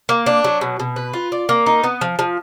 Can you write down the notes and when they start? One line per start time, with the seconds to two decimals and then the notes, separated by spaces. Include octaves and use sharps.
0.09 A#3
0.26 D4
0.44 F#3
0.61 B2
0.80 B2
0.96 B4
1.13 F4
1.32 D5
1.49 A#3
1.66 D#4
1.84 B3
2.01 F3
2.19 F3